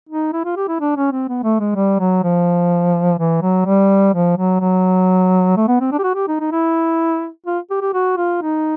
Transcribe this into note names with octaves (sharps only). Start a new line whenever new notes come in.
D#4
E4
F4
G4
E4
D4
C#4
C4
B3
A3
G#3
G3
F#3
F3
E3
F#3
G3
F3
F#3
F#3
A3
B3
C4
D4
G4
F#4
G4
D#4
D#4
E4
F4
G4
G4
F#4
F4
D#4